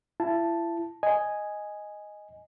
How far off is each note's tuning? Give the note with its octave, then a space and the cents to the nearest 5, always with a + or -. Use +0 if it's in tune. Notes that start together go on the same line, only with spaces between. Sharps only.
E4 +35 A5 +0
D#5 +0 G#5 +0